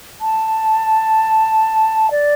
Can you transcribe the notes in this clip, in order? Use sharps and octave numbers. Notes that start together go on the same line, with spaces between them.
A5
D5